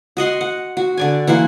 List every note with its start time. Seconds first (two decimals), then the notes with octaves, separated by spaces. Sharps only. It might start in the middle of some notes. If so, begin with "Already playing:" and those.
0.17 F#4 D#5 F#5 C6
0.41 F#5
0.77 F#4
0.97 D3 D5 G#5
1.27 E3 A#3 F#5 C6